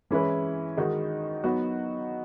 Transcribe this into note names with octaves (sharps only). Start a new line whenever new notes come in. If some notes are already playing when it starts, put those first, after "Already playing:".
E3 G#3 C#4 E4 B4
D#3 G#3 D#4 F#4
F#3 B3 D#4 F#4